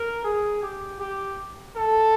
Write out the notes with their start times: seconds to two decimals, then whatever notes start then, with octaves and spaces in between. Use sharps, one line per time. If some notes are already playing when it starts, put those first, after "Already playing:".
Already playing: A#4
0.25 G#4
0.63 G4
1.00 G4
1.76 A4